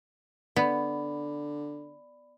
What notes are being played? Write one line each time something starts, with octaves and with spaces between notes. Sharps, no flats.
D3 B3 D5 B5